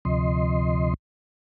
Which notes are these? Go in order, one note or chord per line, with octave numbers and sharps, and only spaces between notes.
D2 C3 F3 D#5 C6